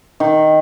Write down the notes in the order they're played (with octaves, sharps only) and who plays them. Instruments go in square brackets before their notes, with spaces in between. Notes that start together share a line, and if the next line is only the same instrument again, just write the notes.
[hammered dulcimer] D#3